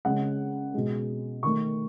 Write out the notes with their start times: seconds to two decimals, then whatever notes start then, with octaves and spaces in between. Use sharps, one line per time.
0.05 C#3 G#3 F#5
0.74 B2 G#3
1.43 D#3 A3 C#6